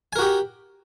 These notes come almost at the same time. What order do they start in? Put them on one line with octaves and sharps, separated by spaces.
G#5 A#4 F#4 G4